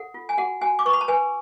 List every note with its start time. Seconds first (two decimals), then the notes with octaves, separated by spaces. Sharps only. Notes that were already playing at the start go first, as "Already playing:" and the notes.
Already playing: A4 F#5
0.14 F4
0.29 G#5
0.38 F#4 F#5
0.61 F#4 G#5
0.79 D6
0.86 B4 C#6
0.93 B5
1.01 A5
1.08 B4 G#5